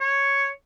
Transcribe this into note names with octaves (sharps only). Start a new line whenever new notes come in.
C#5